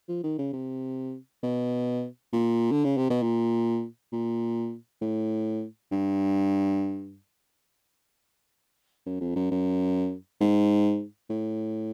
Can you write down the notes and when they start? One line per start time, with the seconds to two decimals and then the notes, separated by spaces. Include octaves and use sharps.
0.09 F3
0.24 D#3
0.38 C#3
0.53 C3
1.43 B2
2.33 A#2
2.72 D3
2.85 C#3
2.97 C3
3.10 B2
3.22 A#2
4.13 A#2
5.02 A2
5.92 G2
9.06 F#2
9.21 F2
9.36 F#2
9.51 F#2
10.41 G#2
11.30 A2